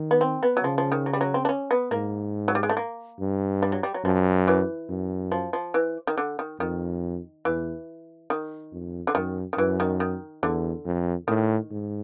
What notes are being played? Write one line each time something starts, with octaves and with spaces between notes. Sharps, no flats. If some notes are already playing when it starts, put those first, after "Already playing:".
Already playing: D#3
B3
C4
B3
F#3
C#3 F3
F3
D#3
F#3
G3
F#3
C4
D4
C#4
B3
G#2 A#3
F#3
G3
G#3
A3
A#3
G2
G3
F#3
G3
F#3
F#2 F3
E3
F#2
F3
F3
E3
D#3
D3
D#3
F2 D#3
E2 E3
D#3
F2
D3
F#2 D#3
D#3
F#2 E3
D#3
D#3
E2 D3
F2
A2 D#3
G#2